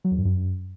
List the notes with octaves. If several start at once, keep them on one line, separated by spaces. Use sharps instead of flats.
F#3
E2
G2
F#2